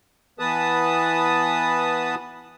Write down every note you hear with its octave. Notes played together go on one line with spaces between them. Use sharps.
E3 B3 B4 A5 D#6